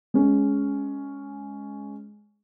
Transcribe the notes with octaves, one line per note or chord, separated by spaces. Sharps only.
G#3 C#4